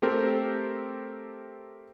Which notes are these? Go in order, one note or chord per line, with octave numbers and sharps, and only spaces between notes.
A3 C4 G4 A4 A#4 C5